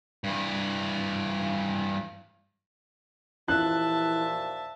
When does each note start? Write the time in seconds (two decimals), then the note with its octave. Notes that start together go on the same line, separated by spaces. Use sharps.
0.24 G2 E3
3.48 D#2 A#2 E3 F3 E5 A5 F#6